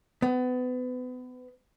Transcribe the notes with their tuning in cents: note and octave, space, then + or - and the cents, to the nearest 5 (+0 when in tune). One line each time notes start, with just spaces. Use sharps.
B3 +30